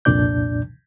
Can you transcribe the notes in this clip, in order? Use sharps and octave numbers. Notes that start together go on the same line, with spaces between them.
C2 F2 A#2 D4 D5 G6